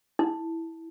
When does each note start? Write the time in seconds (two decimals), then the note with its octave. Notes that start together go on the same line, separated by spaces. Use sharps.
0.19 E4